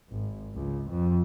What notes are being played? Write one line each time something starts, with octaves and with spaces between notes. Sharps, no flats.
G#1
C#2
F2